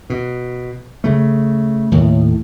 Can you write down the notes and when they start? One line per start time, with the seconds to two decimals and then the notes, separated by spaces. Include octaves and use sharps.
0.10 B2
1.04 C#3 A3
1.91 D#2 A2